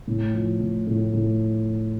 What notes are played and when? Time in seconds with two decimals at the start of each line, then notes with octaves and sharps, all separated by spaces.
0.08 A2
0.34 F3
0.60 A2
0.87 A2
1.13 A2